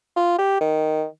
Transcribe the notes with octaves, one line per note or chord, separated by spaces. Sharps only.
F4
G4
D#3